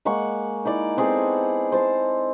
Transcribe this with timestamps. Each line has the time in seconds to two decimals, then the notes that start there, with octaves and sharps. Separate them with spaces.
0.05 G#3 A#3 F#5 C#6
0.65 D#4 E4 D5
0.97 B3 C4 G#4 A4
1.72 C5 A5 C6